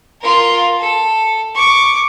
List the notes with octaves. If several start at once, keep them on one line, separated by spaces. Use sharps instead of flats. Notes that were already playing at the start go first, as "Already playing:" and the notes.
F4 A#4
A4
C#6 D6